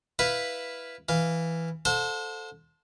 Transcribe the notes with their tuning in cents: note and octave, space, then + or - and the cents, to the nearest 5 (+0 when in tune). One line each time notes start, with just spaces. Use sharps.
E4 +0 B4 +0 F5 +0
E3 +0 F5 -10
A4 +0 C5 +0 F#5 -45